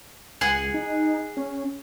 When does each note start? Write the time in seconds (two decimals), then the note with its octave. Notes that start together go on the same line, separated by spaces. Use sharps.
0.41 C#2 G#4 F#5
0.74 D#4
1.37 C#4